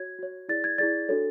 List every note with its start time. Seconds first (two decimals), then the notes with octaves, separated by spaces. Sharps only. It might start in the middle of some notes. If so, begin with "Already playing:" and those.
Already playing: F#4 C#5 G#6
0.19 F#4 C#5
0.49 E4 G#4 D5 A6
0.64 G#6
0.78 E4 G#4 D5 A6
1.09 D4 F#4 A4 C#5